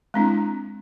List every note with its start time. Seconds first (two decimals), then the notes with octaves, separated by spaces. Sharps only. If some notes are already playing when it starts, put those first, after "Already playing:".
0.14 G#3 C4 D4 E4